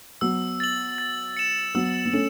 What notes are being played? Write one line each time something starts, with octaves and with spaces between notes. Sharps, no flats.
F#3 B3 E6
A6 F#7
A6
C#7 E7
F#3 B3 E6
B3
A3 C#4 E7